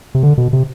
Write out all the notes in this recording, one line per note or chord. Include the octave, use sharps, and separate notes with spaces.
C3
D3
B2
C3